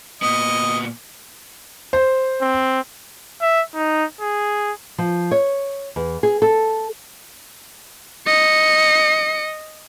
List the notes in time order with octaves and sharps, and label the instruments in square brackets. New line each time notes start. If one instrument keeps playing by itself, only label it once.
[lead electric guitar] A#2 B3 [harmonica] D#5
[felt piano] C5
[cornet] C4
[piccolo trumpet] E5
D#4
G#4
[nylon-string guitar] F3
C#5
E2
G#4
A4
[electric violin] D#5 C#7